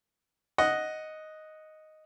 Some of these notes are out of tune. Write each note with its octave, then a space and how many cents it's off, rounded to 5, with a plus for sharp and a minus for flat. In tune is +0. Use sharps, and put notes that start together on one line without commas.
D#5 +0 F#5 +0